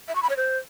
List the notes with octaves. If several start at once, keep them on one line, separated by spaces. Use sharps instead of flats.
E5
C#6
B5
C#5
C5